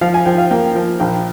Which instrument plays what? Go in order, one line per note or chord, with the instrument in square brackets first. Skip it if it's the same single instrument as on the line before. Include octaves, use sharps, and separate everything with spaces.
[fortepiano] F3 F5
G#5
F3 G5
F5
A#3 G5
F3
A#1 G5